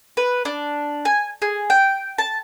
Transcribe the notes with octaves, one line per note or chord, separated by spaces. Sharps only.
B4
D4
G#5
G#4
G5
A5